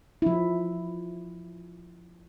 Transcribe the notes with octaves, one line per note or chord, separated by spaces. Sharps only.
F3 E4